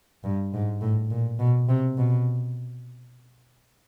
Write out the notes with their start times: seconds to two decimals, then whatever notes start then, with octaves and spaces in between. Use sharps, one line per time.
0.24 G2
0.53 G#2
0.81 A2
1.10 A#2
1.39 B2
1.69 C3
1.97 B2